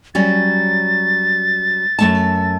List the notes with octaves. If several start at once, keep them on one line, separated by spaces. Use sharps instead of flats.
F#3 G3 C#4 A6
F#2 A3 A5